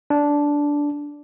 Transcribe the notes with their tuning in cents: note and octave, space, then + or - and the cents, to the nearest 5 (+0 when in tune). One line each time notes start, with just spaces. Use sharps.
D4 -10